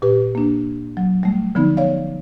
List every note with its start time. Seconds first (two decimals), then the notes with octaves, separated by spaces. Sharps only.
0.02 A#2 G4 B4
0.35 A#3 D4
0.97 F#3
1.23 G3 A3
1.55 D3 F3 B3 D#4
1.77 C#5 D5 F5